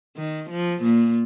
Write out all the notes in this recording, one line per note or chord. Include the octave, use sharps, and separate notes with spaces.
D#3
F3
A#2